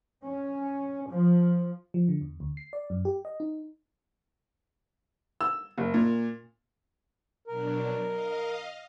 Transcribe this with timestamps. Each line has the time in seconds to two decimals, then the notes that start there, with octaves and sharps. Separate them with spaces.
0.23 C#4
1.10 F3
1.94 F3
2.09 D3
2.21 E2
2.40 D2
2.57 C7
2.73 D5
2.90 F#2
3.05 G4
3.25 D#5
3.40 D#4
5.41 E6
5.78 F#1
5.94 A#2
7.47 B2 F#3 D4 A#4
8.06 D#5 F5